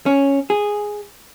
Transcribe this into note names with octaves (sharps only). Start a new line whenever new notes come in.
C#4
G#4